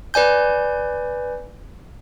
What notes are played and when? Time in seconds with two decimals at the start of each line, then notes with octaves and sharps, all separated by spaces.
0.14 B4 D5 G#5 G6